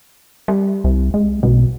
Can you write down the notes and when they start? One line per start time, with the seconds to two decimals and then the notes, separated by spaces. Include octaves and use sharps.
0.48 G3
0.84 C2
1.14 G#3
1.43 B1 B2